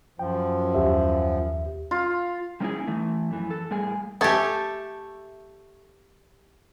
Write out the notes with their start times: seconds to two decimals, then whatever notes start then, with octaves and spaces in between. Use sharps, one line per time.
0.19 F#2 F3 G5
0.74 D#2 G4 E5
1.91 F4
2.60 G3 A#3 C#4 D#4 E4 G#4
2.87 E3 A3
3.31 F#2 E3
3.50 A4
3.71 A2 G3 A#3 G#4 G#5
4.21 A3 G4 A4 E5 G#5